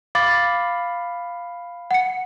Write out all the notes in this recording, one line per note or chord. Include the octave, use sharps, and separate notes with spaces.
F5 B5 D6 A6
F#5 C#7